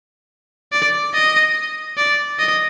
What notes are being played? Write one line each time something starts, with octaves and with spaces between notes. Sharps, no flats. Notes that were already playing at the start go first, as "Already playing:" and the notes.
D5
D#5
D5
D#5